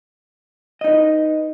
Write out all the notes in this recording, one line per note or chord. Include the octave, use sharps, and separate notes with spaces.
D#4 B4 D#5